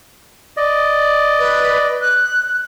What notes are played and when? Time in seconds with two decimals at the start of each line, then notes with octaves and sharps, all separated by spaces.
0.57 D5 D#5
1.39 B4
2.02 F#6